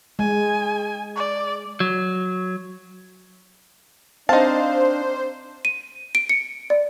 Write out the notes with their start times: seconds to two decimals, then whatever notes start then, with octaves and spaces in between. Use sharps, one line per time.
0.19 G#3 G#5
1.16 D5
1.80 F#3
4.29 C4 D4 D#4 C5 F5 A5
5.65 D#7
6.15 D7
6.29 C#7
6.70 D5